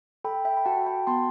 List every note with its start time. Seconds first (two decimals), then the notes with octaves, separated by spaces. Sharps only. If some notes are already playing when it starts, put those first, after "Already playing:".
0.24 A4 G5 B5
0.45 E5 G5
0.57 B5
0.65 F#4 F#5 A5
0.86 G5 B5
1.07 B3 A5 C6